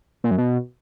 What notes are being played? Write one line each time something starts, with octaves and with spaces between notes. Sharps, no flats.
A#2
F#2
B2